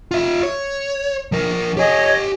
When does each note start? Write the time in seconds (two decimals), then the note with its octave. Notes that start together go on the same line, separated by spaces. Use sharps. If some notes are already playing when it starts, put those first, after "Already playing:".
0.11 F4 E5
0.43 C#5
1.32 F3 A#4
1.77 G4 C#5 D#5 G#5